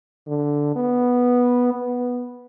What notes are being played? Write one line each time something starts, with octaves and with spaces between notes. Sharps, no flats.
D3
B3
B3